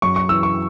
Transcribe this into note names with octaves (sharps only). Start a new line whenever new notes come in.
F#2 C#6
C#6
E3 E6
C#6